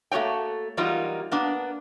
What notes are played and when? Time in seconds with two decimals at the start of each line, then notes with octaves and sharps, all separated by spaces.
0.11 A3 A#3 F#4 C#5 G5
0.77 E3 F#3 G3 A#3 D#4 F4
1.32 A#3 B3 D4